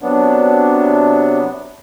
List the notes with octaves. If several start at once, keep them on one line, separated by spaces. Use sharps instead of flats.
C3 F#3 B3 D4